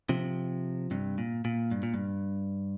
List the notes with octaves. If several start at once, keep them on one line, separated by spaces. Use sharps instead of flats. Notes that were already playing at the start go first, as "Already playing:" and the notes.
C3 F3
G2 C3
A#2
A#2
G2
A#2
G2